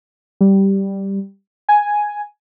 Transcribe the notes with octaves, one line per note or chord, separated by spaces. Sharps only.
G3
G#5